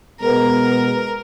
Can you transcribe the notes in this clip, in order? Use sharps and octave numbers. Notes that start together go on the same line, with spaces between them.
B2 G#3 B3 A#4